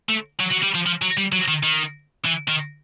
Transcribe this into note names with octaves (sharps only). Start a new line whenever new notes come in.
A3
F#3
F#3
G3
F3
F3
F#3
G3
F#3
D#3
D#3
E3
D#3